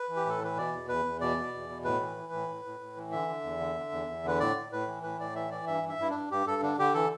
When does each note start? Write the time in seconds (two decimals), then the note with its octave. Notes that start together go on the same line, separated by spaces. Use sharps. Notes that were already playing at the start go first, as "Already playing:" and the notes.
Already playing: B4
0.09 E3
0.16 G4
0.26 A2 A4
0.42 E3 B4
0.57 B2 D5
0.73 E2
0.89 E2 B4
1.05 E2
1.21 B2 D5
1.37 B2
1.53 E2
1.69 B2
1.84 A2 B4
2.00 E3
2.17 E3
2.33 A2
2.48 A2
2.65 A2
2.80 A2
2.96 E3
3.12 D3 E5
3.28 D3
3.44 E2
3.60 D3
3.76 D3
3.92 E2
4.07 E2
4.23 D3 B4
4.40 A2 D5
4.56 A2
4.72 A2 B4
4.87 E3
5.03 A2 B4
5.20 A2 D5
5.35 E3 E5
5.51 E3 D5
5.67 G2 E5
5.83 G2
5.89 E5
5.98 G2 E4
6.10 G2 D4
6.31 G2 G4
6.47 G2 A4
6.62 D3 D4
6.79 D3 G4
6.94 E3 A4